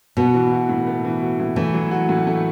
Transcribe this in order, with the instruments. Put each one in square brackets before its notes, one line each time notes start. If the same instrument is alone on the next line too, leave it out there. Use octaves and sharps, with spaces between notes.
[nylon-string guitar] B2 [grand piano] B3
[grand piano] E3
F#4
A2
B3
E3
F#4
A2
[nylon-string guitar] E3 [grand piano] A3
[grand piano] F#3
F#4
A2
A3